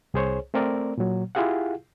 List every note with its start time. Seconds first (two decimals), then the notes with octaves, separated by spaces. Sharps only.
0.14 C2 G#4 C5 C#5
0.54 A3 C4 A#4 D5
0.98 A#2 F#3
1.35 E4 F4 G4 G#4 F5 F#5